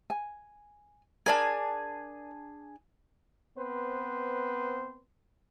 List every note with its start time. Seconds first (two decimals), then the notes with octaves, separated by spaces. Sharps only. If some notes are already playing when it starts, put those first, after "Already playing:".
0.10 G#5
1.26 D4 G#4 A#4 D5 G#5 A5
3.58 B3 C4 B4 C5